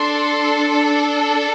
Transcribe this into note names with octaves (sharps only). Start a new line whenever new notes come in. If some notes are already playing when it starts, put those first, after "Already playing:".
Already playing: D4 A4 C6